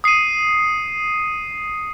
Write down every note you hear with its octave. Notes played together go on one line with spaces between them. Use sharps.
D#6 C7 C#7 D#7